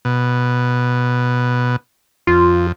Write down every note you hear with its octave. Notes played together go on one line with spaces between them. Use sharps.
B2
F2 F4